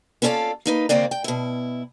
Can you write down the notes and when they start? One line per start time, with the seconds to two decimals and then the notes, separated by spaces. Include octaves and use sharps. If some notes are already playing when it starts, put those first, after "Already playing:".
0.22 B3 C#4 F4 A4 D5 F5
0.66 A#3 D#4 B4
0.89 D#2 C#3 A#3 C4 D5
1.11 G5
1.24 B2 E4